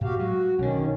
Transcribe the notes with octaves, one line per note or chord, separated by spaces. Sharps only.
A2 F#4 G4 F5
F#3 G#3 F#4
B1 D3 D#3 C#4